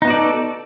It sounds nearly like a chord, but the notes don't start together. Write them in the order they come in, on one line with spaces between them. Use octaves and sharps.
D#4 B3 F#4 D5 A4